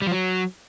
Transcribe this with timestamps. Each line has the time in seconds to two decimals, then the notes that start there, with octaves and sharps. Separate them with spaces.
0.02 G3
0.07 F3
0.12 F#3